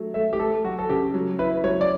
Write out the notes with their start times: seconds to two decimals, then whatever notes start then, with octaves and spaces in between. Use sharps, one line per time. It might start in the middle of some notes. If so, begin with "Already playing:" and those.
Already playing: F#3 A3
0.14 A3 E5
0.33 G4
0.40 A3 A4
0.64 F#3 F#4
0.79 A4
0.89 C#3 G4
1.14 F#3
1.39 E4 B4
1.64 F#3 C#5
1.81 D5